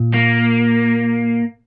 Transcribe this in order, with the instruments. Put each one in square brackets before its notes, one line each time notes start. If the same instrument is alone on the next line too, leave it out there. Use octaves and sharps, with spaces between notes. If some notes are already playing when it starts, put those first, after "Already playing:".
Already playing: [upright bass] A#2
[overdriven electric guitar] A#3